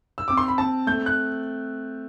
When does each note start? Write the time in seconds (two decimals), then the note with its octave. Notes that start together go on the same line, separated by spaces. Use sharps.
0.18 E6
0.28 C4 D6
0.37 C6
0.48 B5
0.58 C4 A5
0.87 A3 G6
1.06 F#6